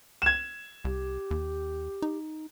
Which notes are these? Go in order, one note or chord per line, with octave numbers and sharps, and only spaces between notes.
G#6 E7
C2 G4
D#2
D#4